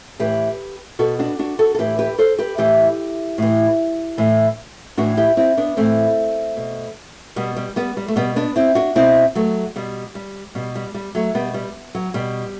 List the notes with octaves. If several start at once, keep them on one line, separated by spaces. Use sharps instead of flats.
A2 E3 G4 B4
B2 F#4 A4
D4 F#4
D4 F#4
F#4 A4
A4
A2 E3 G4 B4
G4 B4
A4 C5
G4 B4
A2 E3 E4 G4
A2 E3
A2 E3
A2 E3 D4 F#4
E4 G4
C4 E4
B3 D4
A2 E3 A3 C4
B2
B2 G3 B3
G3
G3 B3
G3
A3
B2 G3 B3
B3 D4
C4 E4
D4 F#4
B2 C4 E4
F#3 A3
B2 G3
G3
B2 G3
G3
G3
F#3 A3
B2 G3 B3
G3
F#3
B2 G3